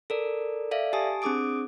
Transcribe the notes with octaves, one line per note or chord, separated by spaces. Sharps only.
A4 A#4 D5
A4 D5 E5 F5
G4 G#5 A5 D#6
C4 D4 G#4 D6 D#6 D7